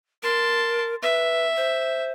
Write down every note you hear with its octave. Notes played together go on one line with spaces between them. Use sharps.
A#4 A5 C6
B4 E5
C5